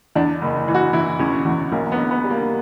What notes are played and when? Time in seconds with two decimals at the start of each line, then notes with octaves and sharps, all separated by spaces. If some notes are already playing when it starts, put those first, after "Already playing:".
0.16 E2 D4
0.41 F#1
0.68 E3
0.74 F#4
0.93 E3 E4
1.19 E2 C#4
1.45 E2
1.72 B1 A#3
1.92 B3
1.97 B1
2.11 B3
2.24 G3
2.31 A#3